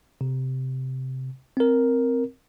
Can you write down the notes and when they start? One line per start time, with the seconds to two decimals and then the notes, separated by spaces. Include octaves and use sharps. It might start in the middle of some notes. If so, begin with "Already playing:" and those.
0.21 C3
1.57 C4 A#4